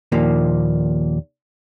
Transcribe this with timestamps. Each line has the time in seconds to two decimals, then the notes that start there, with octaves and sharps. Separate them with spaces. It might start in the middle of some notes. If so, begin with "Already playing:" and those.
0.12 D#2 A#2 F3 A#3